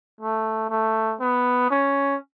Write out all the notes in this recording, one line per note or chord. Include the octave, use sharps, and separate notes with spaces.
A3
A3
B3
C#4